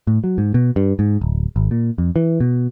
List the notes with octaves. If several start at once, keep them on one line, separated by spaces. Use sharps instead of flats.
A2
F#3
G#2
B2
G2
G#2
D1
G#1
A#2
F2
E3
B2